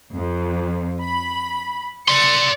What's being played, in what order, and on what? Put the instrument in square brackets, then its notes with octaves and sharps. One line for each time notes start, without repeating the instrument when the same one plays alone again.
[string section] F2
B5
[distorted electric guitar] D5 C6 [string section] C#7